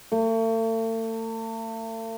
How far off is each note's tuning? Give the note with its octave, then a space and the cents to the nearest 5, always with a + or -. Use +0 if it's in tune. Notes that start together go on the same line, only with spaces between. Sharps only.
A3 +40